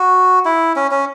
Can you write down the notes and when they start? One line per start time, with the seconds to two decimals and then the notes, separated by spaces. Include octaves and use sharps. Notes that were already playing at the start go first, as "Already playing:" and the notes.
Already playing: F#4
0.45 E4
0.76 C#4
0.91 C#4